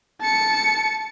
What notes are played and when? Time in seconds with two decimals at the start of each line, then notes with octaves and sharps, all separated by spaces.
0.21 A5 C#7